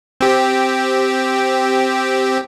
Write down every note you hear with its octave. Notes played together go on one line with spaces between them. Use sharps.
C4 G4